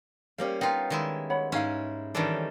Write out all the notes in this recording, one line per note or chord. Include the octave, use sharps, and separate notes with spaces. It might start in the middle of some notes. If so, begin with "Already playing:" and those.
G3 A#3 C#4 G4 C5 F5
B3 D#4 F4 G5
D#3 G#3 E4
C#5 F#5 B5
G#2 C#4 D#4 E4 F5
D#3 E3 G3 C#4 D4 A4 C#5